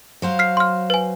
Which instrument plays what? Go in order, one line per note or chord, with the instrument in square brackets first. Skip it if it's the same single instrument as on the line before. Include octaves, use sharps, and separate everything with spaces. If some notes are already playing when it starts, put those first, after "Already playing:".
[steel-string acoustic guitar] F#3 C5 F5
[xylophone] F6 B6 C7
C6 F6
B4 G#5